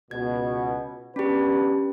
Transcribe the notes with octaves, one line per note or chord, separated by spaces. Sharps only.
C#2 B2 G#6
B3 C#4 D4 G4 B4